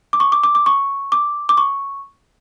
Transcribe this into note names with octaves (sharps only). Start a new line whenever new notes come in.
D6
C#6
D6
D6
D6
C#6
D6
D6
C#6